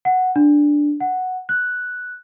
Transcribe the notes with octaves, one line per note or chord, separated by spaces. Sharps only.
F#5
D4
F#5
F#6